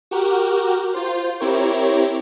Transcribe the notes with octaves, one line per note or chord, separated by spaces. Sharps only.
F#4 G4 A#4
F4 C5
C4 E4 G4 A#4 C#5